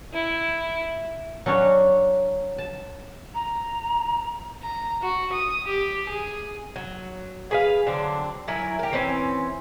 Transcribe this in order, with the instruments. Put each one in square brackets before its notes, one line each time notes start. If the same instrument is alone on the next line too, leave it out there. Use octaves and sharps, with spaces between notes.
[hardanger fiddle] E4
[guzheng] F#3 C#4 D4 C#5
A5
[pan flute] A#5
[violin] A#5
F#4
D#6
G4
G#4
[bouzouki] F#3
G#4 B4 F5
D3 F#3 C4 D4
F#3 E4 A#4 G#5
G4 A#4
E3 C4 C#4